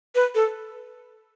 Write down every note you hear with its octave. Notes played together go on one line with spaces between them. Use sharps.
B4
A4